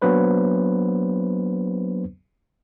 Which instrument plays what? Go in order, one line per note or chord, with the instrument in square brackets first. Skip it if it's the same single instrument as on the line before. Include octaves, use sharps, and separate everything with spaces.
[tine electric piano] F#3 A#3 B3 D4 B4 C5